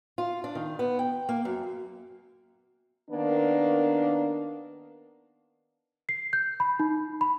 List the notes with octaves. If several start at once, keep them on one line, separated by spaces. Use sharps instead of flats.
F4
D4
D#3
B3
G5
A#3
F#2
D#3 A#3 B3 D4
C7
G6
B5
D#4
B5